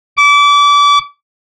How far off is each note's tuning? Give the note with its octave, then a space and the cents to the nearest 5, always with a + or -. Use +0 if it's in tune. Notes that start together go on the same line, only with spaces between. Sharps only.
D6 -30